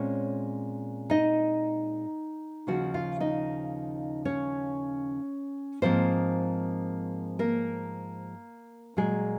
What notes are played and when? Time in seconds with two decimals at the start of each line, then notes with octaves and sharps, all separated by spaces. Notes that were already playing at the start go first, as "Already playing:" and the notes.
Already playing: A#2 G#3 C4 C#4 C#5
1.10 D#4 D#5
2.67 D#2 C#3 F3 F#4 F#5
2.94 F4 F5
3.20 D#4 D#5
4.25 C#4 C#5
5.82 G#2 F3 A#3 C4 C5
7.39 A#3 A#4
8.97 A#2 F#3 G#3 A#3 G#4